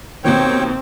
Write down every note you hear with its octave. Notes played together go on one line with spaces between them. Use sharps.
D#2 B2 D#3 C4 C#5 G5